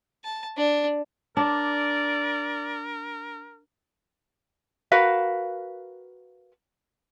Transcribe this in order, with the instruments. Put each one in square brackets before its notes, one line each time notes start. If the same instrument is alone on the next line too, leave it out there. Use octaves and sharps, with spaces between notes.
[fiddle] A5
D4
[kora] D4 [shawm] A#4 [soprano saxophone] D5
[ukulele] F#4 A#4 B4 F5